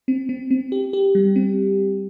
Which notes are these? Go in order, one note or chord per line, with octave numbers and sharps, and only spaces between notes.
C4
C4
C4
G4
G4
G3
C4